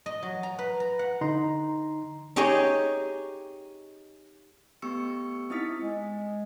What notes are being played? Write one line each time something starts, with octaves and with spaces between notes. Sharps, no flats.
D#5
F#3
A#5
B4
A#5
F#5
D3 D#4 A#5 C6
D#4 G4 G#4 C#5 D#5
A3 B3 G4 C#6 E6 C#7
C4 D#4 E4 D#6 A6 B6
G#3